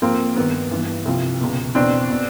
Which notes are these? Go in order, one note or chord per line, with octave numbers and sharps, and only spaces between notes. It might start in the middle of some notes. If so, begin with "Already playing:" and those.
G#2 F3 A#3 C4
G2 D#3 B3
G2 E3
C2 C3 F3
C#2 B2
E2 B2 C4 D4
B2